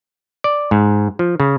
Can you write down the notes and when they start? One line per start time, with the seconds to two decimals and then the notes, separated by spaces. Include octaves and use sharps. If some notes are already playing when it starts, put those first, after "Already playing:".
0.44 D5
0.71 G#2
1.19 F3
1.40 C#3